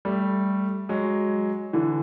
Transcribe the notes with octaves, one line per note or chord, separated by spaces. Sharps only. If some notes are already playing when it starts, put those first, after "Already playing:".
G3 A3
F#3 G#3
D3 E3